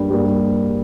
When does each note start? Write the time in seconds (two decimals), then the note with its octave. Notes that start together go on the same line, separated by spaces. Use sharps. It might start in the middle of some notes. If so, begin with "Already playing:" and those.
Already playing: G2 G3 A#3
0.10 G3 A#3